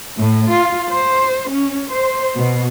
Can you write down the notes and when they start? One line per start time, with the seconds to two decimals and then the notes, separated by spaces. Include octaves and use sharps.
0.19 A2
0.51 F4
0.89 C5
1.49 C#4
1.91 C5
2.37 B2